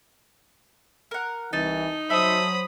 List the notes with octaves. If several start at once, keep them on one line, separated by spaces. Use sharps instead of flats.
A#4 F#5
C2 E3 D#4 A5
F#3 A4 C5 E5 B5 D#6